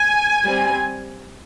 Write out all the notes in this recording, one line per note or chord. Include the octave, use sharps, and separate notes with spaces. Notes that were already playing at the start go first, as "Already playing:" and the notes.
Already playing: G#5
G3 C4